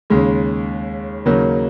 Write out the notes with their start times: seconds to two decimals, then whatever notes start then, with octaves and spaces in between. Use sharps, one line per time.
0.10 D#2 C#3 G#3 C#4
1.26 D#2 C#3 F#3 A#3 D#4